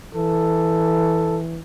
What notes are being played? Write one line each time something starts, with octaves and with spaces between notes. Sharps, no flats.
E3 A4